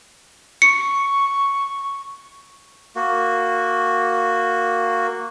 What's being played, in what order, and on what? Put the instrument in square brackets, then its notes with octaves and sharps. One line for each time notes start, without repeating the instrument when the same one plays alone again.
[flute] C#6 [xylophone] C#7
[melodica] A#3 F#4